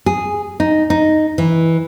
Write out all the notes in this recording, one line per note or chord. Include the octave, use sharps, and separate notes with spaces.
G#4
D#4
D#4
E3